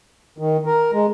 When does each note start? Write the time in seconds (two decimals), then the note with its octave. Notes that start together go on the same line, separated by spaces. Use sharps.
0.38 D#3
0.66 A#4
0.93 G#3